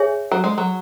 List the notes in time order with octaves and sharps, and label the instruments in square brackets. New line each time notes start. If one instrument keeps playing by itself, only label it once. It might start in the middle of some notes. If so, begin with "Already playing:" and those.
Already playing: [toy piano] G#4 C#5 E5 G#5
[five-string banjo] F#3
G#3
F#3